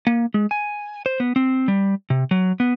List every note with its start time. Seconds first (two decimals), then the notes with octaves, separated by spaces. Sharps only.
0.07 A#3
0.34 G#3
0.51 G#5
1.06 C5
1.20 B3
1.36 C4
1.68 G3
2.10 C3
2.31 F#3
2.60 B3